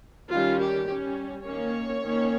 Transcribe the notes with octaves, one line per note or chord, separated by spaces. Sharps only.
D#3 G3 C#4 F4
G4
G3 C#4
D#3 A#3 C#4 C#5
D#3 A#3 C#4